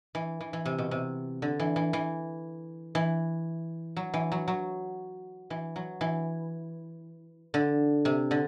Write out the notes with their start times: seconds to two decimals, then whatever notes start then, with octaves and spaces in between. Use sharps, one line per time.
0.15 E3
0.41 E3
0.53 E3
0.65 C3
0.78 B2
0.91 C3
1.42 D3
1.60 E3
1.76 E3
1.93 E3
2.95 E3
3.96 F#3
4.14 E3
4.32 F#3
4.48 F#3
5.50 E3
5.76 F#3
6.01 E3
7.54 D3
8.05 C3
8.31 D3